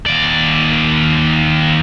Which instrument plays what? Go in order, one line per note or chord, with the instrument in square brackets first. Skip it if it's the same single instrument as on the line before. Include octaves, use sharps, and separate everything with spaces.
[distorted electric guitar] D#2 D5